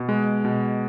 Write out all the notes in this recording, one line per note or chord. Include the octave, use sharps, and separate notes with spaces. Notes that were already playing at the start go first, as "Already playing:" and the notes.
Already playing: B2
G#3
B2